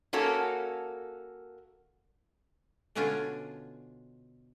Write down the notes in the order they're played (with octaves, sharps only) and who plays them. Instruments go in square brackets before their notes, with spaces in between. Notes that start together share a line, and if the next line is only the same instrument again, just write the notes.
[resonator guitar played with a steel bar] A#3 C#4 F#4 A4
[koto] B2 D3 C#4 D4 F4 G#5